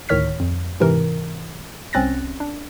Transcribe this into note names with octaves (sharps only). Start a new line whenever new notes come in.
D2 A2 D#3 C#5 F6 B6
F2
G#2 C3 E3 A#4
C2 C4 C#4 F#6 A6 A#6
D4